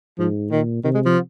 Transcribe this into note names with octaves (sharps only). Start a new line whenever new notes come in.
G#2 F3
A#2 D#3
C3 D#3
G#3
F3